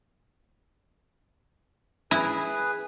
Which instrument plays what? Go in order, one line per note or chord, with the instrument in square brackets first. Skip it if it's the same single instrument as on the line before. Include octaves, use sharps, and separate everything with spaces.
[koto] E4 [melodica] G#4 B4